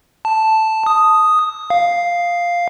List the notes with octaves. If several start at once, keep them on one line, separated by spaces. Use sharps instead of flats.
A5
D#6
F5